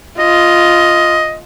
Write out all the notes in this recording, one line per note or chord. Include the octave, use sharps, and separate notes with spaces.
F4 D#5